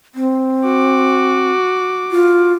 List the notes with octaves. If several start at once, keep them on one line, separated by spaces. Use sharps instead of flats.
C4
F#4 D6
F4